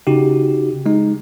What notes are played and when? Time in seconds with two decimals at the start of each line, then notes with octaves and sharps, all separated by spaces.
0.07 C#3 D#4 F#4 G4
0.86 G#3 D#4